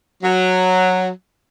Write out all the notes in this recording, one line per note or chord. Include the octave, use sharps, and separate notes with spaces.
F#3